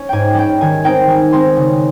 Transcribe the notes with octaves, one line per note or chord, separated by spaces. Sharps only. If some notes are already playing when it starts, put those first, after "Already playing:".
Already playing: C#4
G#2 G5 G#5
G3 C#4 G5
D#3 G#5
G#3 C4 D#4 G5
D#3 G#5
G#3 C4 D#4 C6
C#3